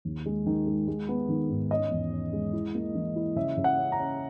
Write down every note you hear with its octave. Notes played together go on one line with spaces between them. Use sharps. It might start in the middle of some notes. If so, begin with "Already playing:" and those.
D#2
G#3
D#3
G#3
G#3
B3
D#3
G#2
C#4 D#5
E2
C#4
G#3
E4
A#3
E3
E4
C#3 E5
C#3
F#5
C#4
A#5
C#4